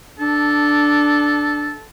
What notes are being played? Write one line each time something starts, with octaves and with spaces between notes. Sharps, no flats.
D4 A4